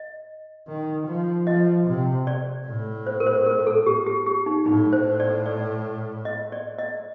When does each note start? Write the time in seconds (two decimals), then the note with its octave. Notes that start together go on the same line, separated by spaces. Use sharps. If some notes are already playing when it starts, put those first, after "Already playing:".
Already playing: D#5
0.68 D#3
1.07 F3
1.47 F3 D#5
1.87 C3
2.27 D5
2.67 A2
3.07 C5
3.20 A#4
3.27 C5
3.46 A#4
3.67 A4
3.86 G4
4.06 G4
4.26 G4
4.46 D#4
4.66 A2 D#4
4.93 C5
5.20 D5
5.46 D5
6.25 D#5
6.52 D5
6.79 D#5